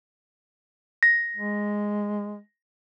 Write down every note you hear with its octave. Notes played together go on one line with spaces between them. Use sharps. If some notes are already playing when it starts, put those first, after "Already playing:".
A#6
G#3